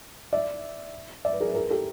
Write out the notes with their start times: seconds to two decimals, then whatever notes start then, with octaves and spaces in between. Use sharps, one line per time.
0.33 D5 E5
1.25 D5 E5
1.33 B4
1.41 G#4 A#4
1.49 B4
1.55 G#4 A#4
1.70 G4 A4